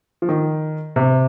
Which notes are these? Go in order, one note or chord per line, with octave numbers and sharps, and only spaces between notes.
F3
D#3
C3